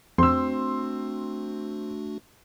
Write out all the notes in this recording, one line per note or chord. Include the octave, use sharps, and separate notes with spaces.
F2 A3 C4 D4 F#4 C6 E6